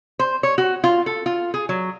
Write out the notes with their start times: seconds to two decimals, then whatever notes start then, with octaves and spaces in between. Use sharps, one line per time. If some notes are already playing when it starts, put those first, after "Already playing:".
0.19 C5
0.43 C#5
0.58 F#4
0.84 F4
1.06 A4
1.26 F4
1.54 G#4
1.69 F#3